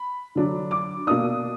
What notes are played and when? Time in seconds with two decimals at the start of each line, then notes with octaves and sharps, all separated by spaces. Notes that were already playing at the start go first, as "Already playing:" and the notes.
Already playing: B5
0.35 D3 F#3 D4
0.71 D6
1.07 B2 A#3 D4 D#6